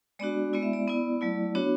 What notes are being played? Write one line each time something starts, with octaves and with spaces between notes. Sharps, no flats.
G#3 B3 D4 F#4 D5
G#3 B3 E4 D5
E5
D5
B3 E4 D5
F#3 A3 E4
B3 D4 F#4 C#5